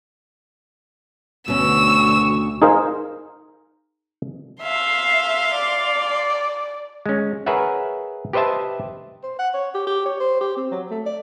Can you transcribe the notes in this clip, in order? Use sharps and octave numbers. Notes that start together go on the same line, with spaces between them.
D2 B2 C#4 C#6 E6
D#4 G#4 A#4 C5 F5
E5 F5 C6
D5
G#3 C#4
G#4 A#4 B4 C#5 E5 F#5
G4 B4 C5 D#5 E5 A5
C5
F#5
C#5
G4
G4
C#5
C5
G4
C4
F#3
A3
D5